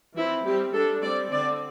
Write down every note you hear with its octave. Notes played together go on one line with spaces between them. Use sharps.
E3 C4 E4
G3 C4 G4
G3 D4 A4
G3 C4 D5
D3 C4 D5